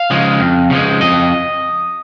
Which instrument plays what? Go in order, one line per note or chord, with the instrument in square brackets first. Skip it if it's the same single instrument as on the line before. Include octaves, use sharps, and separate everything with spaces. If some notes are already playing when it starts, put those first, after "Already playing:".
Already playing: [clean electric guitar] F5
C#3 F3 G#3
F2
C#3 F3 G#3
F2 D#5